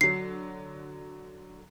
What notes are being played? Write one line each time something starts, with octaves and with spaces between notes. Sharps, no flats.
D3 F#3 C7